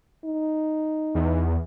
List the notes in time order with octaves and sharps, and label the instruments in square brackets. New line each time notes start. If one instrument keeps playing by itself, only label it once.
[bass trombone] D#4
[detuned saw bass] E2